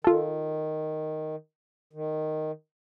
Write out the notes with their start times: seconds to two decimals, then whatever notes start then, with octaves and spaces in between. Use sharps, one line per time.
0.04 D#3 F4 A4
1.93 D#3